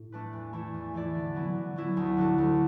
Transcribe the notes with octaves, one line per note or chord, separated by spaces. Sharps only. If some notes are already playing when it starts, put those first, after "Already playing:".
Already playing: A2
A3 D4 B4
E2
E3 A3 E4 D5
E2
E3 A3 E4 D5
D3
F#3 B3 E4
D3
F#3 B3 E4
D2
D3 F#3 D4 A4
D2